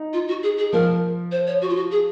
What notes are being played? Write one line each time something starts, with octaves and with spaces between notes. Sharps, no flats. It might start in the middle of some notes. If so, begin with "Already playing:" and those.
Already playing: D#4
F4
F#4
G#4
G#4
F3 A#4
C5
C#5
F#4
F4
F#4
G#4